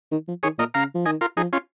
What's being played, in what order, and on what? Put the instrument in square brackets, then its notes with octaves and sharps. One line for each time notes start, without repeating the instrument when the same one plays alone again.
[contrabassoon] D#3
F3
[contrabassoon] D#3 [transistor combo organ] G#4 C#5
[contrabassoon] A#2 [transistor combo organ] A#4 D#5
[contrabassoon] C#3 [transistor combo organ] F5 A#5
[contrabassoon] F3
[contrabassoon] D#3 [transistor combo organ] D#5 G#5
[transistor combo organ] F4 A#4
[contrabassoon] F3 [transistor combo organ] D#4 G#4
[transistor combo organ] C#4 F4